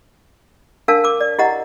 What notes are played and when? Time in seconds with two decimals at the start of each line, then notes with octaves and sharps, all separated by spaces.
0.88 D4 A#4 F5 A5
1.04 A#4 D6
1.21 D5
1.39 E4 G4 D#5 F#5 A#5